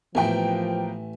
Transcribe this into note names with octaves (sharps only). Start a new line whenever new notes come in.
A1 E3 F3 A#3 B3 G5